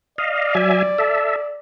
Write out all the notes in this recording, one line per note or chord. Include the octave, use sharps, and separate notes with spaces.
D5 D#5 F5
F#3 E5 G#5
A4 E5